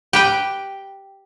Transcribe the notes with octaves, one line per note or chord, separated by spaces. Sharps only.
G4 B4 G5